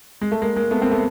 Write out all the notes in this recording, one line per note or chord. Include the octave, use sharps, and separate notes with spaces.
G#3
A3
G#3 A#3
G#3 A#3
A3 B3
A#3 C4
A3 B3